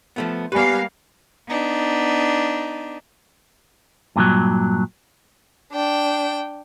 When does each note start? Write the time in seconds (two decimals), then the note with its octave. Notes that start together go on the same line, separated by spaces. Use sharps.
0.16 F3 A3 B3
0.52 G3 A#3 B3 G4 B4 F5 G#5
1.49 B3 D4 D#4
4.16 G2 A#2 D3 F#3
5.72 D4 G5